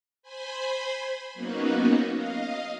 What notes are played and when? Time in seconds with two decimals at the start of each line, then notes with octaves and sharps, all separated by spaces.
0.23 C5 G#5 B5 C6
1.34 F#3 A#3 B3 C#4 D#4 F#4
2.13 D#5 F5